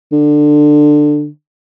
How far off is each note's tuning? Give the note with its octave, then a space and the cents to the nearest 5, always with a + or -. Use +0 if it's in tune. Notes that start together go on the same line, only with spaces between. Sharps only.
D3 +15